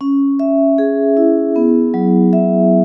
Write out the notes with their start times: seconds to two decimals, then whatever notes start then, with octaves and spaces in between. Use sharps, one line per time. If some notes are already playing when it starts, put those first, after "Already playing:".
0.01 C#4
0.39 E5
0.78 G#4
1.17 E4
1.56 B3
1.94 F#3
2.33 E5